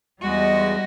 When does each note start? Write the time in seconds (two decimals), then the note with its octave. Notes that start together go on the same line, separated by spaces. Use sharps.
0.22 E2 G3 G#3 F#4 D#5